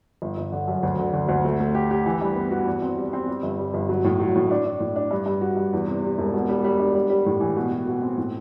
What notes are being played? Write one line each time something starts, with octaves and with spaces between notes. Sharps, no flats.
G1
G1
D3
F#2
D2
D3
D2
D2
A3
A3
G4
G4
E3
G2
B3
F#4
E2
C4
G3
C4
G3
G1
G3
G1
F#3
A2
F#3
A2
D4
D4
A2
D4
G2
G2
F#4
G2
E2
C3
C3
E1
B2
G3
G3
D4
G3
G3
A2
E3
B2
B2
B2
C4
A2